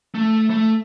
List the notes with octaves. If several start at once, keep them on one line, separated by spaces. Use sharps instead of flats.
A3
A3